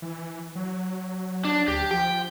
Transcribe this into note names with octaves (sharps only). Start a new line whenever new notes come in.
E3
F#3
D4
D2 G4
F3 G5